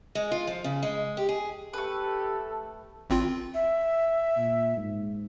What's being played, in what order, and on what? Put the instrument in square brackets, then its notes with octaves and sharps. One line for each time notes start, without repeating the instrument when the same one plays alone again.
[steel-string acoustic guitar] G#3
F4
F3
C#3
G#3
G4
G#4
[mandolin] A3 B4 [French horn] G4 [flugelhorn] A4
[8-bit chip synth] G#1 C4 F4
[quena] E5
[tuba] A#2
G#2